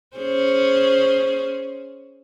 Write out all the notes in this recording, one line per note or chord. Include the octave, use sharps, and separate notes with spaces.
C#4 G#4 C5